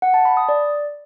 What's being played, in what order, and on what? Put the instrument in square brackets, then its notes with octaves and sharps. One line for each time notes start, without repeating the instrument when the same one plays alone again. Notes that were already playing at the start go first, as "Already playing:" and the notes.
[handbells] F#5
A5
B5
D#6
D5